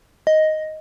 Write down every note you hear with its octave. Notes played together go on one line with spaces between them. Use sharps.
D#5